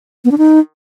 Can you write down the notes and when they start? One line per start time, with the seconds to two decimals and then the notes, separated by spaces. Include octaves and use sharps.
0.25 B3
0.31 D4
0.38 D#4